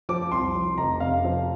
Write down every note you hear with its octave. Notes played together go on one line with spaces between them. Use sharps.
F3 D6
C2 C6
F3
F1 A#5
C3 F5
F3